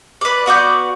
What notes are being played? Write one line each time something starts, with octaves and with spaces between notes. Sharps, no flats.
B4 D5
B3 F#4 D5 G6